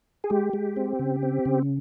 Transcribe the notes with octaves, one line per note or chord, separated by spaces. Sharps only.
G#4
G#3 G4
G#3
C4
C#3
C4
C#3